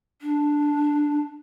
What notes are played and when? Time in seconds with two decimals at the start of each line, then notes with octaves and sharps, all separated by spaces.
0.22 D4